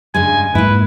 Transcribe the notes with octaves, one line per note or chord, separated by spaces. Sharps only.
G2 C#3 G#3 G#5
G#2 A#3 E4 B4